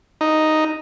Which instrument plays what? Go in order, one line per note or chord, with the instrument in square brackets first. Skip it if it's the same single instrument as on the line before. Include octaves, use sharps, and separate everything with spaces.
[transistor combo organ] D#4